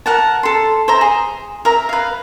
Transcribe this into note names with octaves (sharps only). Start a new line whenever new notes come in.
A#4 F#5 A5
A4 C6
C5 E5 A#5
G#4
A#4 E5 A#5
B4 F5